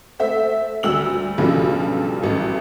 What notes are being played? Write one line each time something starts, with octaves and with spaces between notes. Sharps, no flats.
A3 C5 E5
D2 G3 E6 F#7
B1 G2 C#3 F3 G3 A3
A1 F#2